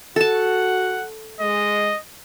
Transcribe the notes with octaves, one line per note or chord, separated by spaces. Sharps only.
F#4 A4 F#5 A5
G#3 D#5